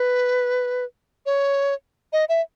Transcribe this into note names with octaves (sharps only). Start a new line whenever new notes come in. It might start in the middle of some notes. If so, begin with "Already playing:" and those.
Already playing: B4
C#5
D#5
E5